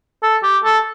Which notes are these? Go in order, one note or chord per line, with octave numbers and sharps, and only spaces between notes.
A4
G4
A4